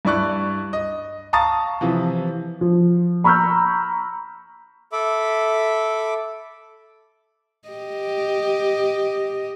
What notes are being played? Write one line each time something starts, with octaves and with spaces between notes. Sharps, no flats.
G2 E4 D5 C#6 F#6
D#5
F5 A5 A#5 C#6 D#6 A6
C3 E3 F3
F3
A#5 B5 C#6 E6 F6 G6
A4 E5 B5 D6
G4 D#5